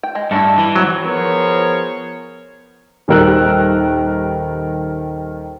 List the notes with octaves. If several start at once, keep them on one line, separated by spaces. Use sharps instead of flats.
G5
G#3
G2 A3 D4 E4
E3
F#3 C4 F#5
F3 B3 G#4 A#4 C5 C#5
D#1 D#3 G3 A#4 E6 F#6